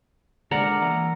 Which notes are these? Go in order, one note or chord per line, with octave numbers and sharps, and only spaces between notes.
G#3 D4 A4 A#4 D5 F#5
E3 A#3 A#5